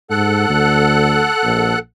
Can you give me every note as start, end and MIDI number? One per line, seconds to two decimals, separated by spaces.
0.10 0.48 44
0.10 1.79 69
0.10 1.79 78
0.10 1.79 90
0.49 1.28 38
1.44 1.73 34